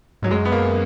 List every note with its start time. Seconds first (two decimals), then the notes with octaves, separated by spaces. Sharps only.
0.22 G#2 F#3
0.31 F#2 G#3
0.45 B3
0.52 A#3